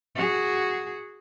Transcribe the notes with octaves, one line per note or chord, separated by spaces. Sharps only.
F#4 G#4